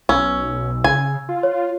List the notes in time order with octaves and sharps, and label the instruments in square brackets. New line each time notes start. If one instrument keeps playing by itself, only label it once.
[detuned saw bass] B1 [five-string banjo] C#4 [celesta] E6
[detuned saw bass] C#3 [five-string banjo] G#5
[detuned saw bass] F4
[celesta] C#5